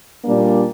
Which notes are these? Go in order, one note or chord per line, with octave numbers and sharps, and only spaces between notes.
A#2 G3 A#3 D4